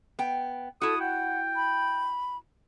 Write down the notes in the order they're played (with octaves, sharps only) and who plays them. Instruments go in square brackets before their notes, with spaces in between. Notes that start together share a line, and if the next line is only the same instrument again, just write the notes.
[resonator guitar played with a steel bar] B3 G5
[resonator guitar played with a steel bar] E4 F#4 [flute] A4 [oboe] D#6
[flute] F#5 [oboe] G5
[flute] B5